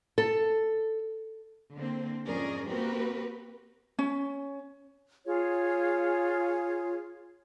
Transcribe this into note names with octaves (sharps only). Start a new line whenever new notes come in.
A4
D3 A#3 C4
F2 G#2 C#4 G#4 A#4 D5
A#3 C4 F#4 G4 A#4 B4
C#4
F4 G#4 C#5